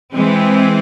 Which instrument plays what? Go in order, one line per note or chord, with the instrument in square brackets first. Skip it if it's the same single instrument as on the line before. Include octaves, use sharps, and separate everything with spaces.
[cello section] E3 G#3 C4